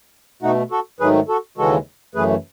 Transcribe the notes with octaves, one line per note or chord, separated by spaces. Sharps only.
B2 A3 D#4 F#4
F#4 A4
G#2 D#3 F#3 A3 G#4 B4
F#4 A4
D#2 C#3 E3 G#3 F#4 A4
F#2 C#3 E3 A3 G#4 B4